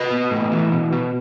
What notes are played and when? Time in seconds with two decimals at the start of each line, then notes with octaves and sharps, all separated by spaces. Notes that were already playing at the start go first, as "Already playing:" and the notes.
Already playing: B4 D#5
0.10 B2
0.31 A2
0.52 E3
0.72 B2
0.92 B2